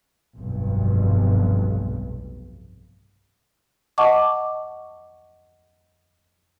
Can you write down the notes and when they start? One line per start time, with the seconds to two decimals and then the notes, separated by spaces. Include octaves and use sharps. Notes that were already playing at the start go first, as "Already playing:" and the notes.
0.37 F1 B1 G2
3.98 D#5 F#5 A5 C#6 D6